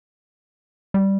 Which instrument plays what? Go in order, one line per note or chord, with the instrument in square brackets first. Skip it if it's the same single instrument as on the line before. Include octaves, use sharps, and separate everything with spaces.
[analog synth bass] G3